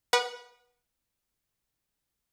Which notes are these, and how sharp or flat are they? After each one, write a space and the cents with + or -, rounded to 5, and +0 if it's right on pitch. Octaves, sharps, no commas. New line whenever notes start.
B4 -25 F#5 +0 D#6 -40